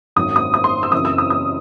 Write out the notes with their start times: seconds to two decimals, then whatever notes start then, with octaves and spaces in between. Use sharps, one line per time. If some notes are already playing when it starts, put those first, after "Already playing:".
0.16 G#1 F#2 D#3 F#3 D#6
0.36 D#6
0.54 D#6
0.64 C6
0.83 E6
0.92 F#2 C#3 E3 C4 D#6
1.05 E6
1.18 D#6
1.30 D#6